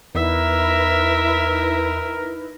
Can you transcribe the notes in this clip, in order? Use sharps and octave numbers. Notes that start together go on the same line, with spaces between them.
E2 D#4 E4 A#4 B4 E5